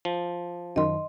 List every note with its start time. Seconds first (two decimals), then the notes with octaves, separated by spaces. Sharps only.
0.05 F3
0.76 F#2 D#3 D#5 C6